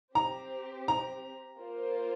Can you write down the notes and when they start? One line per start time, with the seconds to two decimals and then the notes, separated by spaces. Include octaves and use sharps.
0.15 C4 G4 C5 A#5
0.88 A#5
1.61 A#3 F4 C5